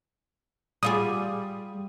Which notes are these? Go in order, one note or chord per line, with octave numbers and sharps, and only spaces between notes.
G3 F4 G#4 D#6